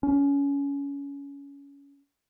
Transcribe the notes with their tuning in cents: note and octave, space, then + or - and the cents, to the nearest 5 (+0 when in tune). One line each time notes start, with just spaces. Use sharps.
C#4 +20